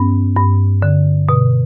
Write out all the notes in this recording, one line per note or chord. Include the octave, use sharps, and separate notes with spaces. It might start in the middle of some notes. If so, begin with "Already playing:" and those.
Already playing: G2 B3 C#4
G2
D3
B2